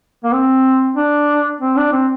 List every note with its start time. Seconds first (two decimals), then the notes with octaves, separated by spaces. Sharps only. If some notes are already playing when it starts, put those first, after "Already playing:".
0.24 A#3
0.33 C4
0.96 D4
1.61 C4
1.77 D4
1.92 C4